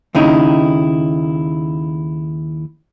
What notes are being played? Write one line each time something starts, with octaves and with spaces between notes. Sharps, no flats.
D#2 C#3 D#4 E4